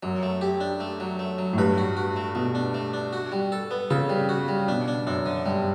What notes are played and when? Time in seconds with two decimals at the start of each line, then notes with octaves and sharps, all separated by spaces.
0.03 F#2 F#3
0.23 A3
0.41 G4
0.61 D4
0.80 A3
1.00 F#3
1.19 A3
1.38 F#3
1.53 A2
1.58 G2 B4
1.78 F#4
1.97 F#4
2.16 A3
2.35 B2 A3
2.55 D4
2.74 A3
2.94 D4
3.13 F#4
3.32 G3
3.52 A4
3.71 B3
3.90 C#3 A4
4.09 G3
4.29 F#4
4.48 G3
4.68 B2 D4
4.88 D4
5.07 F#2 D4
5.26 D3
5.46 G2 G3